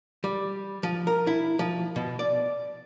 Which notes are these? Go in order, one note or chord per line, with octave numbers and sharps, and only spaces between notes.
G3
F3
A#4
E4
F3
B2
D5